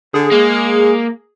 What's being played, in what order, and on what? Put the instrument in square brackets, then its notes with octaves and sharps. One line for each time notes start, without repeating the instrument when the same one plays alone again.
[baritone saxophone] D3 [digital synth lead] G#4
[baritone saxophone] G#3 [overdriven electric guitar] A#3